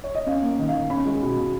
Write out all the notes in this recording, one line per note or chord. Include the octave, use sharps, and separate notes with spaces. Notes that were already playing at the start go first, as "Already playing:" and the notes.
C#5
D#5
C#4 F5
A#3
D#3
F5
D#3
C#4 B5
G#3
B2
B2